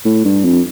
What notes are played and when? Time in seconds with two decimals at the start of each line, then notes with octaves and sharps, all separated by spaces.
0.05 A2
0.25 G2
0.45 F2